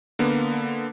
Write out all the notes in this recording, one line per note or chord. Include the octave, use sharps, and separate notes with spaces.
D3 A#3 B3